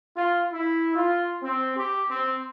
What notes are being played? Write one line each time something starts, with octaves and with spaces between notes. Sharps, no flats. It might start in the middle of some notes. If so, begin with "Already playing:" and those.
F4
E4
F4
C4
G4
C4